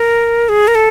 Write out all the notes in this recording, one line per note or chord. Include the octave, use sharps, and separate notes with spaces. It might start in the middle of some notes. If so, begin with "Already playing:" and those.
Already playing: A#4
G#4
A#4
A4